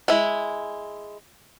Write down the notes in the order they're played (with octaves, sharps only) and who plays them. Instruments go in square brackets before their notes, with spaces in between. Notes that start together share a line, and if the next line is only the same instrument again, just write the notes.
[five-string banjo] G#3 E4